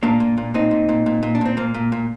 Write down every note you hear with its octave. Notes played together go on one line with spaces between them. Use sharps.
A#2 A#3 D4
A#2
A#2
A#2 C4 D#4
A#2
A#2
A#2
A#2
D4
A#2 C4
A#2 A#3
A#2
A#2